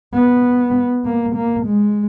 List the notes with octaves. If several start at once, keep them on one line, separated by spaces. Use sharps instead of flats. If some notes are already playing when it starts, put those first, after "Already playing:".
B3
A#3
A#3
G#3